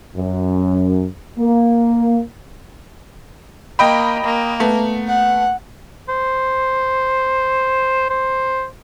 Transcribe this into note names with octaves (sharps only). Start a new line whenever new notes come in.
F#2
A#3
A#3 D#5 G5 B5
A#3
A3 B3
F#5
C5
C5